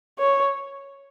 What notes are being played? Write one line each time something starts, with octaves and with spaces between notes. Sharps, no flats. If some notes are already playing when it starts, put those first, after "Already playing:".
C#5